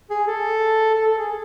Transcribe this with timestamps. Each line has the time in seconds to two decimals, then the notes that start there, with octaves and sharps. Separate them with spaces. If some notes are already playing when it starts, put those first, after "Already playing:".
0.10 G#4
0.27 A4
0.95 A4
1.07 A4
1.18 G#4